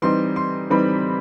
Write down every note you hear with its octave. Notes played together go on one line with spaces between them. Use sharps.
E3 G3 C4 D#4 C6
C6
E3 G3 C4 D#4 B5